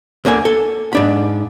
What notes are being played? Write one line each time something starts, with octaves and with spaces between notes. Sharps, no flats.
D2 D3 A#3 G#5
A4
G#2 D4 B5